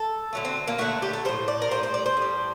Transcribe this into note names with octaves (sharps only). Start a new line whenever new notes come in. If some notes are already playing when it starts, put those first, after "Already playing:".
Already playing: A4
D3 F#3 A3
C4
A#3
D3 F#3 A3 F#4
G4
A4
A2 G3 C5
D5
A#4
A2 G3 C5
C5
D5
C5
A2
G3